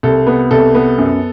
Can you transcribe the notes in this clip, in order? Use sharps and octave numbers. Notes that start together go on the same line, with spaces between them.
C2 A4
B3
C2 A4
B3
F#2